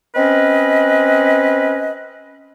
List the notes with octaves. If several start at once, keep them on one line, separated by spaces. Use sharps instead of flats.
C4 C#4 B4 D#5